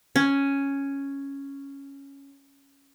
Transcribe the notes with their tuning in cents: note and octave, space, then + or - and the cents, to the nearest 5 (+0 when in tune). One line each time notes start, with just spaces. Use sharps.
C#4 +0